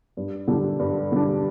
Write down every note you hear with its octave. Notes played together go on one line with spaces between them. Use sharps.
G2
D3 G3 D4
G2
D3 G3 D4